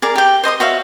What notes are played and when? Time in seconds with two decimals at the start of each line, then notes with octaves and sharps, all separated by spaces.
0.02 G#4 A#4 D5
0.15 G4 G5
0.43 C5 D#5 C6 D#6
0.60 F#4 C#5 E5 F5